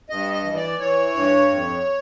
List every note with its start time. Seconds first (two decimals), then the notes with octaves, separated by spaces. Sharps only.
0.10 G2 D#5
0.33 D#5
0.45 E3
0.56 D5
0.79 E3 C#5
1.14 G2
1.50 F2